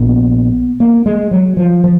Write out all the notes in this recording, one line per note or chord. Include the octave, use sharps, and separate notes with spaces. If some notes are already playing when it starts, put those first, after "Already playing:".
Already playing: A#1 A#2 B3
A#3
G#3
F#3
F3
F3